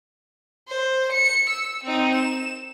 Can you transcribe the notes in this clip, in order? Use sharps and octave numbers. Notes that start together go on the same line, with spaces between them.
C5
C#7
E6
C4 D#4
E7